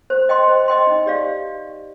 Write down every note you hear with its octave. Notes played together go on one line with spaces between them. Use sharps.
C5
D#5 G5 C6
C5
D#5 G5 C6
D#4
G4 D5 F5